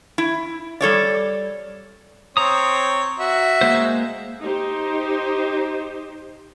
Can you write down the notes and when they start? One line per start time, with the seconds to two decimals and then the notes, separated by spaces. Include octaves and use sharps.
0.18 E4
0.81 G3 A4 C#5 D5
2.37 C4 C#5 A#5 D#6
3.19 F#4 E5
3.61 G#3 A#3 C5
4.42 D#4 G4 C5